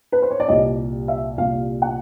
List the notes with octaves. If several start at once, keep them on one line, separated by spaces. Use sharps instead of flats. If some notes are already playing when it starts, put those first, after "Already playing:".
B4
C5
C#5
D5
C2 A#2 G3 D#5
E5
C2 A#2 G3 F5
F#5